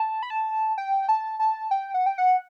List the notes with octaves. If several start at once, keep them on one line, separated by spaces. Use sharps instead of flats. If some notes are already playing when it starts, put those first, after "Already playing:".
Already playing: A5
B5
A5
G5
A5
A5
G5
F#5
G5
F#5